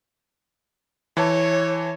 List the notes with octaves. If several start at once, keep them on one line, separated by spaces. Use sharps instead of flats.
E3 C#5 A5